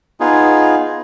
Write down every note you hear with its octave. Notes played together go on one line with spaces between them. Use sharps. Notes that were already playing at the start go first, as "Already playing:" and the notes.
B3 D#4 F4 G#4